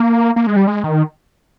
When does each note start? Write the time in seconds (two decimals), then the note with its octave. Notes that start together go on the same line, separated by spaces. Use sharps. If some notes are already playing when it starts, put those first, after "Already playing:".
Already playing: A#3
0.36 A#3
0.47 G#3
0.56 G3
0.67 G#3
0.84 D#3